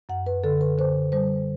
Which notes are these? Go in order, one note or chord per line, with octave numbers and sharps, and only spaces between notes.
F#2 F#5
B4
D3 A4
B4
D3 C5
G3 C5